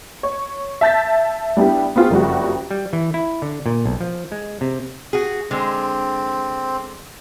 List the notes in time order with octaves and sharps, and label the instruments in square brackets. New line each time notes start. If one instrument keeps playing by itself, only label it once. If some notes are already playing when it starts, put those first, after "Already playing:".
[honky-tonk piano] C#5
E5 A5 G6 A6 B6
G3 B3 D4 E4 G4
B3 C4 F4 F#4 G#4
F#1 F2 G3 F#4
[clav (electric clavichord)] G3
E3
E4
D3
A#2
B1
F3
G#3
C3
[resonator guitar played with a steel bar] F#4 G#4
[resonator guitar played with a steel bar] D3 G#3 [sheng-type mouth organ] C4